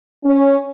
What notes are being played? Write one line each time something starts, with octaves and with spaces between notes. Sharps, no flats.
C#4